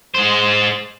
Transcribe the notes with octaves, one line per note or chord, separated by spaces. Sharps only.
G#3 C5